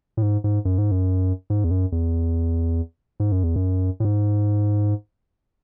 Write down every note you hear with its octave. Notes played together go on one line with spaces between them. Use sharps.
A2
G#2
G#2
F#2
G#2
F#2
G#2
E2
F#2
E2
G#2
F#2
E2
F#2
A2
G#2